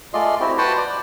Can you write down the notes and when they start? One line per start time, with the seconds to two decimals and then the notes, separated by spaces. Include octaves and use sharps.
0.14 G#3 A3 F4 D5 D#5 C6
0.40 C4 E4 F#4 G4
0.58 F#4 B4 F#5 G5 A5 C6
0.77 D5